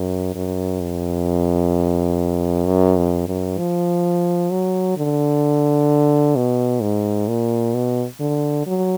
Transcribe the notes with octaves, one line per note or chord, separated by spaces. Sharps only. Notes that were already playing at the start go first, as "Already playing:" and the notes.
Already playing: F#2
F#2
F2
F#2
F2
F#2
F3
F#3
D3
B2
G#2
A#2
B2
D3
F#3